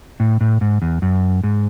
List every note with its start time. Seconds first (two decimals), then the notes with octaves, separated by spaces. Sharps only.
0.20 A2
0.41 A2
0.61 G#2
0.82 E2
1.02 F#2
1.44 G#2